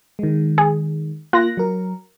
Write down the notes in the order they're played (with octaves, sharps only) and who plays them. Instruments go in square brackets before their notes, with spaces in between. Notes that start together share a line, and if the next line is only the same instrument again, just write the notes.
[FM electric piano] D#3 G#3
[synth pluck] G#4
[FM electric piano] A#3 F#6 A#6 [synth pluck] F4
[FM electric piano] F#3 A#4